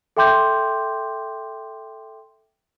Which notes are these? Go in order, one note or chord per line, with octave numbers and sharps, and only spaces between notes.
A4 E5 G5 C6 D6 G6